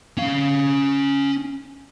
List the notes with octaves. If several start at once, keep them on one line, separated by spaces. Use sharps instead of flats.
C#4 F5